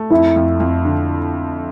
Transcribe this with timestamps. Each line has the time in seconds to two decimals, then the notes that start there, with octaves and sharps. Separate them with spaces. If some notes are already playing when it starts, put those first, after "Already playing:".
Already playing: A3
0.10 F2 E4
0.36 F2
0.60 F2
0.85 D3